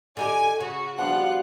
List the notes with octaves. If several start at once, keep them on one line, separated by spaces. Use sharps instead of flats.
D3 D#4 G4 G#5
C#3 F#4
B2 F3 G3 D4 F4 F#5 F#6